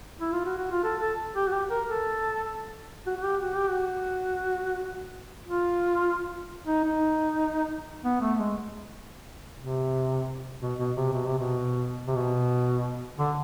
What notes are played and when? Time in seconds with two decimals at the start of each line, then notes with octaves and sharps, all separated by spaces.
0.21 E4
0.32 F4
0.45 F#4
0.58 F#4
0.71 F4
0.84 A4
1.01 A4
1.36 G4
1.47 F#4
1.52 G4
1.70 A#4
1.87 A4
3.07 F#4
3.17 F#4
3.24 G4
3.41 F#4
3.55 G4
3.69 F#4
5.47 F4
6.67 D#4
6.84 D#4
8.04 B3
8.21 A3
8.39 G#3
9.59 C3
10.62 B2
10.79 B2
10.96 C3
11.13 B2
11.26 C3
11.39 B2
12.07 C3
12.16 B2
13.19 D3